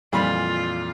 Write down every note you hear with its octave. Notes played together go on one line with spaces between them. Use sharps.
F2 A#2 E3 G3 F4 B5